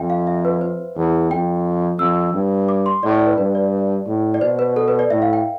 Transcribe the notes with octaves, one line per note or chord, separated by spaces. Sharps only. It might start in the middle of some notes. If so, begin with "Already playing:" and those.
Already playing: F2 E5 G5
F5
E5
B4
C5
E2
F2 G5
F2 E6
G2
D6
C6
A2 D5
D5
B4
G2 B4
D5
A2
D5
B2 C5
B4
A4
B4
D5
A2 E5
F5
G5